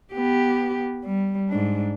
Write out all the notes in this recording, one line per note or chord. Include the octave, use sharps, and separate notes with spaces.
B3 G4
G3
G#2 D4